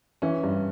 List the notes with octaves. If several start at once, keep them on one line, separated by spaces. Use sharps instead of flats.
E3 C#4
G2